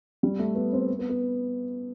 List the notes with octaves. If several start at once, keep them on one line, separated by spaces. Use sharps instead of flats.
G3
A3
B3
C4
B3
B3